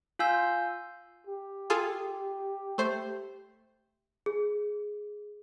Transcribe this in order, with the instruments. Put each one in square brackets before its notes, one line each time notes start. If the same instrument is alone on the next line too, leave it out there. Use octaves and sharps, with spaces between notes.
[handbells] F4 F5 G#5 E6 G6
[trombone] G4
[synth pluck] F4 G#4 A4
A3 C5
[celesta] G#4